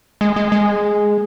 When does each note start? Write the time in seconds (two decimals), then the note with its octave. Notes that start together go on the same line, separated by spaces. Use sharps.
0.21 G#3
0.36 G#3
0.52 G#3